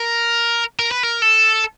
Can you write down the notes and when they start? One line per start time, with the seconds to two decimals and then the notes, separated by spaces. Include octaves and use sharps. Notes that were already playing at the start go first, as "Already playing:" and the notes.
Already playing: A#4
0.79 A#4
0.91 B4
1.03 A#4
1.22 A4